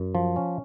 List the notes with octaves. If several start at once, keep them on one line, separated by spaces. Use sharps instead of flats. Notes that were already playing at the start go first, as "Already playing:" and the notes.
Already playing: F#2
F3
C#4